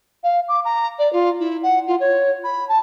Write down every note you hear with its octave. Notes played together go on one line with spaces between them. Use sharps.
F5
D6
A#5
D5
F4
E4
F#5
F4
C#5
B5
A5